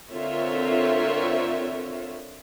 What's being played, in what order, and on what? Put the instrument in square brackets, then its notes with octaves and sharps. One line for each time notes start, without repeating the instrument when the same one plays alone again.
[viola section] D3 C4 F4 A#4 C#5 E5